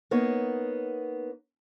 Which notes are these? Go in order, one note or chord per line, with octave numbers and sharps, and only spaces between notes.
A#3 B3 D#4 C#5